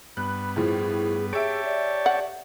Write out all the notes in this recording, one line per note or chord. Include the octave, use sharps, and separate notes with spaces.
G2 B3 B5 F#6
A2 F3 G#4
G4 G#4 C#5 E5 A5 D7
D5
F#5